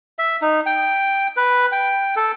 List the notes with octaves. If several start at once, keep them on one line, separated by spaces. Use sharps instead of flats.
E5
D#4
G5
B4
G5
A4